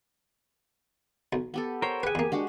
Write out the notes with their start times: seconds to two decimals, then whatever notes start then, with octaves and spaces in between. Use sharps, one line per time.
1.33 B1
1.54 B3 G4 A4
1.82 A#4 C5 C#5 G5
2.03 G4 G#4 B4 F#5 G#5
2.15 E2 A#3
2.32 G#3 D4 F#4 G4